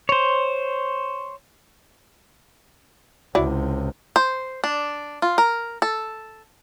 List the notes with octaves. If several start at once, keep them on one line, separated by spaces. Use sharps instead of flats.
C5 C#5
C#2 C3 E4 F#4 D5
C5
D4
F4
A#4
A4